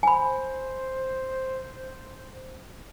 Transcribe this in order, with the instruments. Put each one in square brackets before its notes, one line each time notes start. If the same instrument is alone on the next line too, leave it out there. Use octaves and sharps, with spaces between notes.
[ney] C5 [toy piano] G#5 B5